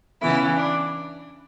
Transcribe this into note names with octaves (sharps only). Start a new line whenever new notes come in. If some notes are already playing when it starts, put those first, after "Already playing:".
C#3 E3 B3 E4
D4